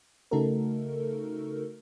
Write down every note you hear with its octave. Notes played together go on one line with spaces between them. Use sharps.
C#3 A3 D#4 F#4 A4 A#4